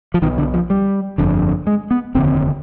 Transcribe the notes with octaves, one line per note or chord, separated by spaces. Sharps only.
F3
B1 B2 D#3
D3
F3
G3
G1 F2 D3
G#3
B3
F1 D#2 D3 C4